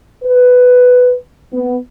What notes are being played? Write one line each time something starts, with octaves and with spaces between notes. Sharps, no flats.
B4
B3